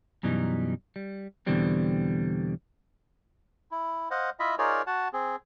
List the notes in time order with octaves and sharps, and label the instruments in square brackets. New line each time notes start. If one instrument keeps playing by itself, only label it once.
[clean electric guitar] F#2 B2 E3 G3 D#4
G3
E2 B2 D3 E3 G3 C4
[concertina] E4
C5 D#5 F5 F#5
E4 F4 D#5 E5 B5
D#4 F4 G#4 A#4 C#5 D5
F#4 F#5 A5
C4 G#4